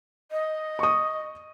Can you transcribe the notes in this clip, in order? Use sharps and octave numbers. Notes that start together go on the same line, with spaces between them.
D#5
C#6 D#6